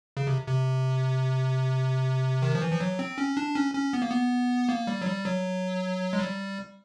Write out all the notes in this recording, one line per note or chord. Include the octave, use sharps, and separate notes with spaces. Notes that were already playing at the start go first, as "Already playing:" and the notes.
C#3
C3
C3
D#3
F3
E3
F3
F#3
C4
C#4
D4
C#4
C#4
B3
A#3
B3
A#3
G3
F#3
G3
F#3
G#3
G3